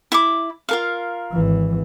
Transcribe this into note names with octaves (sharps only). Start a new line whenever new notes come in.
E4 B5 D6
F4 A#4 F5
G#1 E3